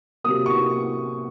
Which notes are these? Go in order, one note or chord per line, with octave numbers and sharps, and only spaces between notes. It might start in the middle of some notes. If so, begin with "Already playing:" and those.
C3 F#3 A#3 D#6
C#6